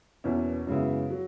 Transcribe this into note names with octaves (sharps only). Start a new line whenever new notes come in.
E2 B2 A#3 C#4 E4
F#2 C#3 G#3 B3 E4
F#3